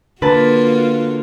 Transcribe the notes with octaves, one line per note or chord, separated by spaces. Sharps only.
D3 A#3 F4 F#4 B4 A5